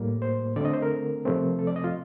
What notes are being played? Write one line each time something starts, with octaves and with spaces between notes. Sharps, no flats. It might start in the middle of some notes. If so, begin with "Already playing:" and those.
Already playing: A2 G3 A#3
C5
D3 A3 C4 D5
D#5
C5
A#4
C3 F3 A3 C4
A4
D5
D#5
F4